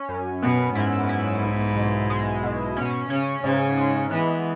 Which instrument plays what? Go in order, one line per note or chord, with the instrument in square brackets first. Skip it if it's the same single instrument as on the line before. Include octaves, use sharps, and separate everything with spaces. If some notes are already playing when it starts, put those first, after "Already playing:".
Already playing: [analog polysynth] C#4
F#2
[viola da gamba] B2 [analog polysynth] B3
[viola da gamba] G#2 [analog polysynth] E4
[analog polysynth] E4
B1
B2
G#3
B2
[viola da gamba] B2 [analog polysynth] C#4
[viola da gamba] C#3 [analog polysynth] C#4
[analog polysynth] G#2 [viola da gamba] C#3
[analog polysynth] G#3
[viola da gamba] E3 [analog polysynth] B3